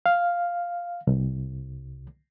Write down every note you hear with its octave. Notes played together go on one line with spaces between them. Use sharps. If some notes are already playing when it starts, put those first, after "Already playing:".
F5
C2